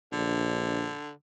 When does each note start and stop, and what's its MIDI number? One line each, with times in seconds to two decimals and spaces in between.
0.13 0.91 34
0.13 1.11 50